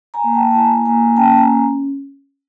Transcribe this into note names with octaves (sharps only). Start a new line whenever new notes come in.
G#5 A#5
A#3
G5 A5
A5
E4 G#5 A#5
A#3 G#5 A#5
C#4 G5 A5
G#5 A#5